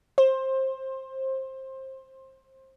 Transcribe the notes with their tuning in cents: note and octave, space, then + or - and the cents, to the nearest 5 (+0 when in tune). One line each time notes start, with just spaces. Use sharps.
C5 +20